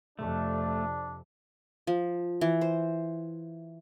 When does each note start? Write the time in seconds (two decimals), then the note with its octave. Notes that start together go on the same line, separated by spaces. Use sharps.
0.19 F2 C3 A3 D4
1.87 F3
2.41 E3
2.61 C5